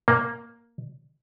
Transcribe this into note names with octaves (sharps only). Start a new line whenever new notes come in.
A#3